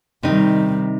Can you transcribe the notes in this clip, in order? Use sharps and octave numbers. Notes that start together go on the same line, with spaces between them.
C3 D#3 G3 D#4